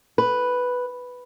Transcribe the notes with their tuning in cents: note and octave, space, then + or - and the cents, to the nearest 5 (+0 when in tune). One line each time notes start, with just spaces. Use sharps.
B4 +0